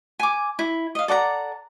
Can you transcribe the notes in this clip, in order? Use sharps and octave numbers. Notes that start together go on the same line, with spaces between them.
G#5 D6
E4
D#5 F5
A4 D5 F#5 A#5